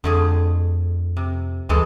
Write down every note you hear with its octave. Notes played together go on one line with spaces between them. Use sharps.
F2 D3 A3 G#4
C3
D2 E3 G#3 A4